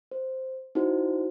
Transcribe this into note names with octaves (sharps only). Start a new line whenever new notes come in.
C5
D#4 E4 F#4 C5